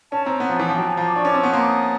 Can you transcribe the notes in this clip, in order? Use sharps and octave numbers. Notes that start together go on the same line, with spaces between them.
C#4 A5
C4 A#5
B3
F3
E3
F3 A5
G#5
F#3 G5
G#5
F3 A#5
D6
D4 C#6
C#4 D6
C4
B3 C#6
A#3 C6
D6
D#6